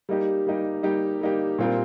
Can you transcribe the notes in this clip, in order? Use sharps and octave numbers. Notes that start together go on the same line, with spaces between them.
G3 A#3 D#4 G4
G3 A#3 D#4 G4
G3 A#3 D#4 G4
G3 A#3 D#4 G4
A#2 G3 C4 F4 A#4